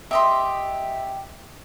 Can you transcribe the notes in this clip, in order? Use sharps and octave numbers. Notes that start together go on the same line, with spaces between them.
G4 D#5 E5 C6